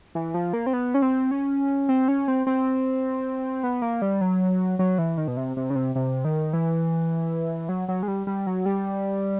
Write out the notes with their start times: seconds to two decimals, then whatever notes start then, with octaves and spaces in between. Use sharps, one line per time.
0.15 E3
0.34 F3
0.53 A#3
0.66 C4
0.73 B3
0.94 C#4
1.02 C4
1.31 C#4
1.89 C4
2.08 C#4
2.28 C4
2.47 C4
3.64 B3
3.82 A#3
4.02 G3
4.21 F#3
4.79 F#3
4.98 E3
5.18 D#3
5.28 B2
5.37 C3
5.57 C3
5.70 C#3
5.76 C3
5.95 C3
6.25 D#3
6.53 E3
7.69 F#3
7.88 F#3
8.03 G#3
8.08 G3
8.27 G3
8.47 F#3
8.66 G3